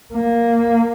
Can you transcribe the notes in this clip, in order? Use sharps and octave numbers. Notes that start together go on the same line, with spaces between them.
A#3